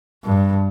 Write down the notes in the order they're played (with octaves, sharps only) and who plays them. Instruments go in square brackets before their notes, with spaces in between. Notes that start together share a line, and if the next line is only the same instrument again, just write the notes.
[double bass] G2